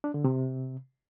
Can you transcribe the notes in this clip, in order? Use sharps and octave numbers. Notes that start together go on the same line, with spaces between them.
D4
D3
C3